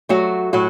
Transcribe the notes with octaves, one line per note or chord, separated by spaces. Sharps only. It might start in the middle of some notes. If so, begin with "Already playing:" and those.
F#3 A3 F#4
A2 F#3 F#4